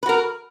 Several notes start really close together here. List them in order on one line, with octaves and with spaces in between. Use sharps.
B4 F#4 A#4